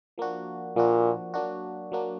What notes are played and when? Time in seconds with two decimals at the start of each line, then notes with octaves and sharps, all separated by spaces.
0.18 F3 A#3 D4 F#4
0.76 A#2 F3 A#3 D4 F#4
1.34 F#3 A#3 D4 F#4
1.92 F#3 A#3 D4 F#4